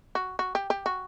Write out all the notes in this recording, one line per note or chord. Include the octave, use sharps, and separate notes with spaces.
F#4
F#4
G4
G4
F#4